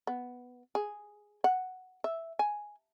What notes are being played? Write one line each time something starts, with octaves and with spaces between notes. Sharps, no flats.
B3
G#4
F#5
E5
G#5